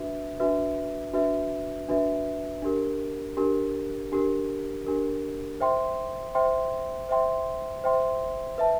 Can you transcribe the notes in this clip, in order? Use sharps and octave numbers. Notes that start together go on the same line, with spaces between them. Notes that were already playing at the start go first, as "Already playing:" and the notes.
Already playing: D4 F#4 B4 E5
D4 F#4 B4 E5
D4 F#4 B4 E5
D4 F#4 B4 E5
D4 G4 A#4
D4 G4 A#4
D4 G4 A#4
D4 G4 A#4
C5 E5 G5 C6
C5 E5 G5 C6
C5 E5 G5 C6
C5 E5 G5 C6
B4 E5 A5